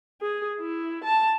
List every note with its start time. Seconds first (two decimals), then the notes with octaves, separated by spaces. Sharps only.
0.22 G#4
0.61 E4
1.04 A5